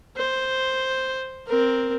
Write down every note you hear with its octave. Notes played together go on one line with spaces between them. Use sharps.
C5
C4 A#4